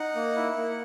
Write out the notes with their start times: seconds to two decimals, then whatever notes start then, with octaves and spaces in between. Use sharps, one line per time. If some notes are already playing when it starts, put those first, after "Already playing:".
Already playing: D#4 F#5
0.15 A#3
0.36 E4
0.56 A#3